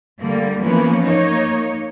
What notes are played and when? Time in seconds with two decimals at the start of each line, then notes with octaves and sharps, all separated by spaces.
0.19 D3 G3 A#3
0.61 E3 F3 A#3 B3 C#4
1.03 A#3 D#4 C#5